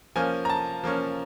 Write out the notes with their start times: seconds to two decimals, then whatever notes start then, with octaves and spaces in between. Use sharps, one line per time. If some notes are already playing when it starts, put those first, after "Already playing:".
0.16 F3 A#3 C#4 G#5
0.45 A#5
0.50 A5
0.84 F3 A#3 C#4